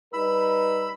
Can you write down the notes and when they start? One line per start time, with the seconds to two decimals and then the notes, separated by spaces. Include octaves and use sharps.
0.13 G3 D#4 B4 B5 E6